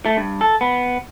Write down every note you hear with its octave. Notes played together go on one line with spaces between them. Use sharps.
A3
G2
A4
B3